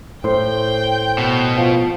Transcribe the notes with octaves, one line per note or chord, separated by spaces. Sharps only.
A2 C5 G5 G6
B2
F3